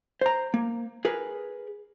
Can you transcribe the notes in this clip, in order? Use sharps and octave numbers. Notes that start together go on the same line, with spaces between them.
C5 A#5
A#3
G#4 A#4 B4